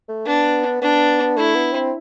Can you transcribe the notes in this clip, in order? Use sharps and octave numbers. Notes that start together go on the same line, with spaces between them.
A3
B3 D4
B3 D4
A3 E4
B3
C4